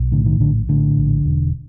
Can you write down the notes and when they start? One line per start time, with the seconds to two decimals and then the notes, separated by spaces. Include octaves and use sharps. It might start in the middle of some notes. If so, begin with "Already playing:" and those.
Already playing: B1
0.12 A2 D3
0.26 D#3
0.40 A#1 D3
0.69 A2 D3
0.97 A#1
1.25 E1